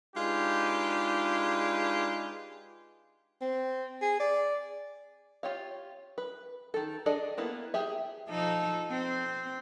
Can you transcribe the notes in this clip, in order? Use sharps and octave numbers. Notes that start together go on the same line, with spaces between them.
G#3 D4 D#4 F4 G4 B4
C4
G#4
D5
F4 G4 C#5 F5
B4
D#3 A4
D4 G#4 A4 D5 D#5
A#3 B3 E4 B4
G4 G#4 E5
F3 D#4 A4
C4